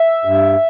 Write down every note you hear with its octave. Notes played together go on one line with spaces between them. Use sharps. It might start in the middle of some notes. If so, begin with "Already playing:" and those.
Already playing: E5
G2